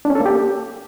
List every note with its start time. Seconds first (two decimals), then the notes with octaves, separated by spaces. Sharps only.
0.05 D4
0.10 C#4
0.15 A4
0.20 A#3
0.26 G4